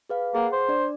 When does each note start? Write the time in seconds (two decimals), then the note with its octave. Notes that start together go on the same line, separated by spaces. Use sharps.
0.10 G#4 B4 F5
0.35 A#3 G#4 F#5
0.52 C5
0.69 D4 D5